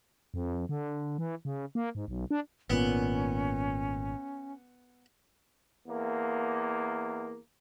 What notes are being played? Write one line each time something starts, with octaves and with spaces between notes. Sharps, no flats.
F2
D3
E3
C#3
A#3
G#2
B1
D4
G#1 A#2 B3 C#4
E2 A#3